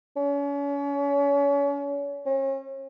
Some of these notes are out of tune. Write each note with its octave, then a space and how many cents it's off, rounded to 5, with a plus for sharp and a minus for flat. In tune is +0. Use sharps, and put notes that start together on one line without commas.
C#4 +35
C#4 -40